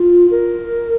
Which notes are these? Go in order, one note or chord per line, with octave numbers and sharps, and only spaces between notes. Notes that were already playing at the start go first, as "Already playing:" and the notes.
Already playing: F4
A#4